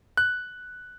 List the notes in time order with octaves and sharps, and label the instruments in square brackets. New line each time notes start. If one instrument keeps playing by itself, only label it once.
[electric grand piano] F#6